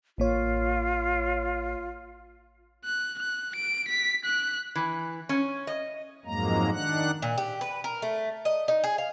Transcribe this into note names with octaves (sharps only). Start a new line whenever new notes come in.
A1 A#3 F4 C#5
F#6
F#6
D7
B6
F#6
E3
C#4
D#5
F2 G#2 F#3 G#3 A#3 A#5
D#3 D4 F#5 F#6
A#2
G4
B4
A#4
A3
D#5
D#4
G#4
F5